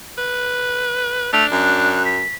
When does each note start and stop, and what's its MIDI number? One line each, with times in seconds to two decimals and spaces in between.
0.18 1.32 71
1.33 1.44 57
1.33 1.97 62
1.33 1.46 101
1.52 2.23 42
1.52 2.03 90
2.05 2.35 95